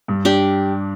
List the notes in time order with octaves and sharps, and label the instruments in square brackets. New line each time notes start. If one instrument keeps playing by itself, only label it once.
[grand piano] G2
[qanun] D4 G4